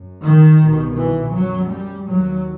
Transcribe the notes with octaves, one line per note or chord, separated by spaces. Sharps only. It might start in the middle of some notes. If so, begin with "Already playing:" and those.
Already playing: F#2
D#3
C2 B2
E3
F#2 F#3
G3
D#2 F#3